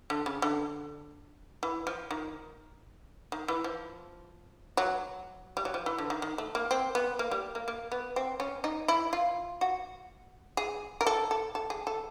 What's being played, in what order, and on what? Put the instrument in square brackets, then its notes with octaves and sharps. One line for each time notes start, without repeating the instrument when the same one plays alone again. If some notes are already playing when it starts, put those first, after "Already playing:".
[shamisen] D3
C#3
D3
E3
F3
D#3
D#3
E3
F3
F#3
G3
F#3
F3
E3
D3
D#3
D#3
A3
A#3
C4
B3
A#3
G3
A#3
A#3
B3
C4
C#4
D#4
E4
F4
F#4
G#4
A#4
A4
A4
A4
G#4
A4